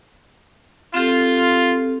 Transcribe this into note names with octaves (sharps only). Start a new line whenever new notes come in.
C4 F4 G4 A4